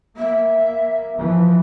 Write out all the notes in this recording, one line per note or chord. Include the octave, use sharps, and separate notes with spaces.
A#3 E5
E3 F3